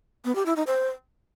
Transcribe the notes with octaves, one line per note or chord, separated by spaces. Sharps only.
B3
G4
E4
D#4
C5